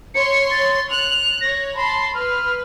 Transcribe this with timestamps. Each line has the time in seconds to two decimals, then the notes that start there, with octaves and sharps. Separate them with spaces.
0.15 C#5 C6 C#7
0.51 A6
0.90 F#6 F7
1.41 C#5 A#6
1.76 A5 B5 C6
2.15 B4 F6